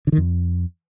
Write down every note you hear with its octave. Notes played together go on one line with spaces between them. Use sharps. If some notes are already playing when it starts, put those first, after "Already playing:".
D3
D#3
F2